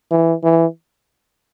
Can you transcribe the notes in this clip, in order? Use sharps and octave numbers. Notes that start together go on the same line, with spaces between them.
E3
E3